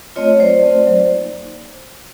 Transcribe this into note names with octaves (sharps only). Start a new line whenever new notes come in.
A3 C4 F4 C#5 D#5
F#3 C5 D5
A3 C4 F4
F#3
A#3 D#4